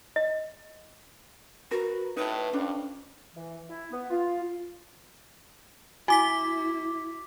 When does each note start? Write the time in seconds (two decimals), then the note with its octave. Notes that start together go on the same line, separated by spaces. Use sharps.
0.16 D#5
1.71 F#4 A#4 B4
2.17 A2 D#4 B4
2.53 F2 C#4 D4
3.35 E3
3.68 E4
3.91 B3
4.10 F4
6.08 E4 F#4 G#5 D6 B6